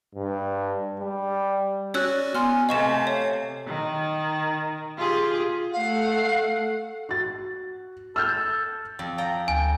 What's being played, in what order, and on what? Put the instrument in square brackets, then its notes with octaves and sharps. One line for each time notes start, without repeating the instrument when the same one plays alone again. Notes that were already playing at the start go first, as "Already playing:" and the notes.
[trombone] G2
G3
[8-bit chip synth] C#4 F#4 D5 [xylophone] C#5 E6 F#6
[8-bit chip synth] B3 [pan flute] G#5 [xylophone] C6 F6
[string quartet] C3 A3 [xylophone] D#5 C#6 E7 [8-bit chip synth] F5
[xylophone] C#5
[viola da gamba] D#3
F4 G4 G#4
[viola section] A3 F#5 [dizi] F5
[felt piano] F#4 A6
[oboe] A4 [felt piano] E6 F6 G6
[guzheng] F2
[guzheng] D5 G5 A#5 [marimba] F5
[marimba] D2 [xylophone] G#5